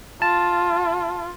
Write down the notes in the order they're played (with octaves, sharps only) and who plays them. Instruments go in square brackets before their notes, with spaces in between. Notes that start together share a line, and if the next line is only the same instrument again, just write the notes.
[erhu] F4 [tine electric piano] A5